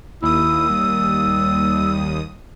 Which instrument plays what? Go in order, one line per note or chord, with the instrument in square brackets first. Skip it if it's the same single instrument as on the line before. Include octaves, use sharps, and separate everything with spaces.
[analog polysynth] D#2 D#6 [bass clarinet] E4 [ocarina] E6
[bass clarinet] G3